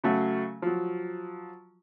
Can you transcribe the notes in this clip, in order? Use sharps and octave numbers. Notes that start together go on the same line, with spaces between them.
C#3 F#3 A3 F#4
F3 F#3